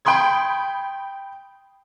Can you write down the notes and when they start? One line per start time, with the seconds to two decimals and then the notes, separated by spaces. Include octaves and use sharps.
0.05 G5 B5 C6 D#6 G#6